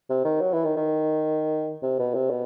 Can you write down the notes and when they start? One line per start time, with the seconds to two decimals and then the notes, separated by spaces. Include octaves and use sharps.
0.10 C3
0.25 D#3
0.41 F#3
0.53 E3
0.65 D#3
0.77 D#3
1.82 C3
1.99 B2
2.15 C3
2.30 B2